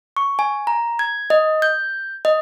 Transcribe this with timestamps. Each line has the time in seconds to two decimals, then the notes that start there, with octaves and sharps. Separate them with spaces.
0.16 C#6
0.39 G#5
0.67 A#5
0.99 G#6
1.30 D#5
1.62 G6
2.25 D#5